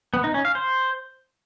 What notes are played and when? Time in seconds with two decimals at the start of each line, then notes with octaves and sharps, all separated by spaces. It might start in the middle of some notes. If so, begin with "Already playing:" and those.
0.14 B3
0.24 D#4
0.34 C#4
0.45 F5
0.55 C5